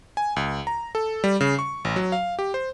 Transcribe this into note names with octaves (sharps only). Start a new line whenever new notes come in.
G#5
C#2
A#5
A4
G3
C#3
C#6
A1
F#3
F5
G4
C5